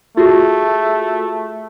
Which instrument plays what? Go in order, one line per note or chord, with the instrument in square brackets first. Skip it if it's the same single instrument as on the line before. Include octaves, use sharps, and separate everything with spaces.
[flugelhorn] A3 [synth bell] F4 F#4 G#4